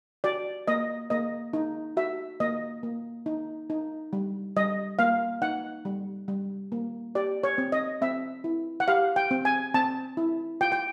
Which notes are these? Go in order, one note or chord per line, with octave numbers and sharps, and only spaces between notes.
F#4 D5
A#3 D#5
A#3 D#5
D#4
F#4 E5
A#3 D#5
A#3
D#4
D#4
G3
G3 D#5
A#3 F5
D#4 F#5
G3
G3
A#3
G4 D5
C#5
C4
D#5
C4 E5
E4
F#5
G4 F5
G5
C4
G#5
C4 A5
E4
F4 G5
G5